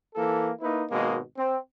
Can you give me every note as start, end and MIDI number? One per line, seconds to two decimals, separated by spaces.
0.15 0.50 52
0.15 0.50 58
0.15 0.50 69
0.61 0.84 58
0.61 0.84 63
0.61 0.84 64
0.61 0.84 71
0.90 1.19 32
0.90 1.19 47
0.90 1.19 56
0.90 1.19 58
1.37 1.57 60